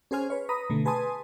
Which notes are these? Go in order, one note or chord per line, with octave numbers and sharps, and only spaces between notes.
C#4 G#4 C5 G#5 F6
B4 C#5
B4 A#5 B5 D#6
B2 D3 A3
G#4 B4 G#5 A5 C6 D#6